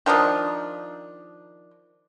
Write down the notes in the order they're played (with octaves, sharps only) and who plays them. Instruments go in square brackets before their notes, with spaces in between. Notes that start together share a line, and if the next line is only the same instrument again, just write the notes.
[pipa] D#3 F3 D4 D#5